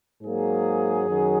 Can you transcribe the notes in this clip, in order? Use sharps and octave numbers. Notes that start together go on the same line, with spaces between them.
G#2 F#3 A#3 G#4
F#2 D#3 F#3